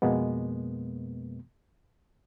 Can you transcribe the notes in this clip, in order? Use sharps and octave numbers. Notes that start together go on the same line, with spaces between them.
F2 B2 G#3 A#3 B3